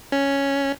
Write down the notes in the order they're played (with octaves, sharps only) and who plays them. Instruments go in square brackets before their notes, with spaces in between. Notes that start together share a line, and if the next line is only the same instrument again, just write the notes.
[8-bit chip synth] C#4